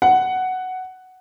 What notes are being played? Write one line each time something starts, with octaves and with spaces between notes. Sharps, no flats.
F#5